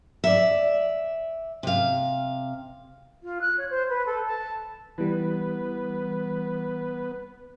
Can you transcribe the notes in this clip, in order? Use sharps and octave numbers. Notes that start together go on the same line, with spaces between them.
D5 E5
C3 F5
F4
F#6
C#5
C5
B4
A4
A5
E3 G3 B3 B4